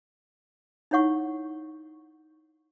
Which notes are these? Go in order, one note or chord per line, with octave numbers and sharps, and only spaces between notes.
D#4 E4 C#5 F#5 C#6